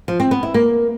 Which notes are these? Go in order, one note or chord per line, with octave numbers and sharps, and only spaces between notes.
F3
C4
B3
E4
A#3